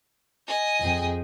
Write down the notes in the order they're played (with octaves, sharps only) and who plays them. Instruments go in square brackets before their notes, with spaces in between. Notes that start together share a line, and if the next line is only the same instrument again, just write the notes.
[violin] D#5 G#5
[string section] F2 G#4 G5